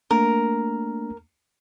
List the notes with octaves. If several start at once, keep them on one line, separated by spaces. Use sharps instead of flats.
A3 A#3 D4 A#4